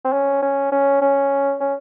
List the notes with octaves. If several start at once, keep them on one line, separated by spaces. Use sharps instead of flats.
C4
C#4
C#4
C#4
C#4
C#4